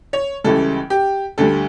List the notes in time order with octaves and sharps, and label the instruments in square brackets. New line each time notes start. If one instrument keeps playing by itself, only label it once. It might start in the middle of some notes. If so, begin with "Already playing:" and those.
[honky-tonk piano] C#5
C#2 C#3 E3 G3 A4
G4
D2 D3 G3 A4